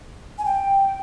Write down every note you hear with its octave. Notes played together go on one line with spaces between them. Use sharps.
G#5
G5